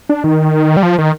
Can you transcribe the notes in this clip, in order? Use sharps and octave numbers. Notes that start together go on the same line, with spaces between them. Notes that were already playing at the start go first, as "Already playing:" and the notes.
D4
D#3
G3
F3
D#3